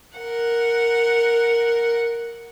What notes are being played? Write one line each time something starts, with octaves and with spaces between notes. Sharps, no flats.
A#4 F#5